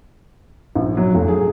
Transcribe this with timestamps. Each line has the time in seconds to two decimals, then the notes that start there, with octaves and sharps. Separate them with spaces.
0.76 A#1
0.97 F#3
1.15 F1
1.28 G#4